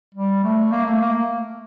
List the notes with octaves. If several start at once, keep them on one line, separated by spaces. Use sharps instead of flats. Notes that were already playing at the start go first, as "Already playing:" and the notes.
G3
A3
A#3
A3
A#3